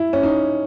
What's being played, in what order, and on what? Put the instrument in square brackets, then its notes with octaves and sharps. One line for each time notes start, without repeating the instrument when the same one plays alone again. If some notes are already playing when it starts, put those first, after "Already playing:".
Already playing: [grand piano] E4
C#4
D#4